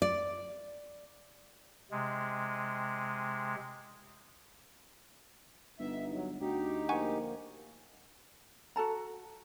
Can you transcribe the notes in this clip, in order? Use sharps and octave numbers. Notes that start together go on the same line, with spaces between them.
D5
C3 G#3
G1 G3 B3 D#4 E5
F#3
D2 D#4 F#4 G4
D3 F3 A#3 F#5 G#5 C#6
F#4 A4 A5 A#5